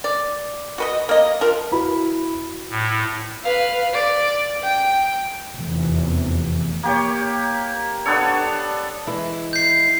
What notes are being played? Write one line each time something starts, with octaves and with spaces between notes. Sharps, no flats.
D5
F#4 B4 D#5
A#3 D#5
F3 A#4
E4 F#4 B4 B5
A2
B4 F5
D5
G5
F1 E2 C3 E3
A#3 G4 C#5
B3 D4 A4 C#5
E3 G#3 E4
G6 C7